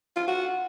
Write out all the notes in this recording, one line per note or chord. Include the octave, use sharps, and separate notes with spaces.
F4
F#4